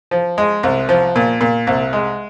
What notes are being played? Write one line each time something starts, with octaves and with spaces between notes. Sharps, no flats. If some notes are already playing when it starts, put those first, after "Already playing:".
F3
G#3
C2
F3
A#2
A#2
C2
G#3